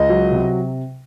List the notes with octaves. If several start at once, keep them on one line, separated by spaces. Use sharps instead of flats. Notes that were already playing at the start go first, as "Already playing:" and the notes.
Already playing: C#2 D#5
F#3
C3